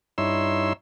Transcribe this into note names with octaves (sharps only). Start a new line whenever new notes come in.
G2 D#4 E4 C#5 C6 E6